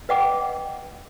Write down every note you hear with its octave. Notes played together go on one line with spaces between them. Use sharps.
B4 D#5 F#5 G5 D6